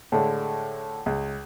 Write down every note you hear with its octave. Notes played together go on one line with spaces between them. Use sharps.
A2 D3 G#3
C#2